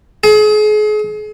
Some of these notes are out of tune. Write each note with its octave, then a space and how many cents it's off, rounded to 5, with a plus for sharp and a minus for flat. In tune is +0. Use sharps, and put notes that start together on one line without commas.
G#4 +35